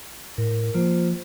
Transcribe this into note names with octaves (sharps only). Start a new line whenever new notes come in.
A2 A#4
F3 A#3 F4 C5